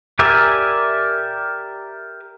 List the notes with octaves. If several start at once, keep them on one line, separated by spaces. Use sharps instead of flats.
G4 A#4 D5 E5 G#5